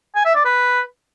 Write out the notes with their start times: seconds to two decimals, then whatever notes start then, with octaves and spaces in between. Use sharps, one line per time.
0.15 G#5
0.25 E5
0.35 D5
0.45 B4